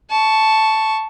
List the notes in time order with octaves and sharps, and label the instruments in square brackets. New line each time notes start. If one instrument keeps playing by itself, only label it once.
[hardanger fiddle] A5 C#6